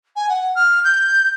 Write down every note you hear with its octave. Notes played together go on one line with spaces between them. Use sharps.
G#5
F#5
F6
G6